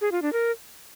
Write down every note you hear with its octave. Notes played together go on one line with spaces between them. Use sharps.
G#4
F4
D4
A#4